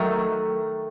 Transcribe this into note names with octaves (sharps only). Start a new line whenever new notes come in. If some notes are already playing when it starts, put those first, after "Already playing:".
Already playing: D#3 F#3 A3